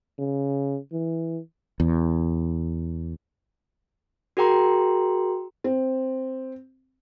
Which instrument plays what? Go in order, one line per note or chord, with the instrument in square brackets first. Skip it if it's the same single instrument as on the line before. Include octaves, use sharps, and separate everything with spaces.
[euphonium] C#3
E3
[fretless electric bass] E2
[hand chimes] F#4 G#4 A#4 G5 A#5 C6
[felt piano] C4